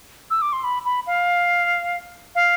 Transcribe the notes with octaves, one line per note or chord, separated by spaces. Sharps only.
E6
D6
C6
B5
B5
F5
F5